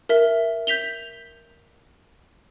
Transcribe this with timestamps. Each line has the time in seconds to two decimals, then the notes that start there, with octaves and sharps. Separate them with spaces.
0.09 A#4 E5
0.67 G6 B6 F7 G7